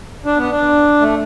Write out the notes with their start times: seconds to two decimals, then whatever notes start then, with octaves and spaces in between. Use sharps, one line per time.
0.25 D4
0.37 B3
0.51 D4
1.01 A3